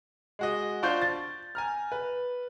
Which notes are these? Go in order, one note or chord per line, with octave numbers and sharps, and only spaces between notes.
G#3 F#4 D#5
D4 F4 C5 C6 C#6 G6
A6
G#5 A#5 F6
B4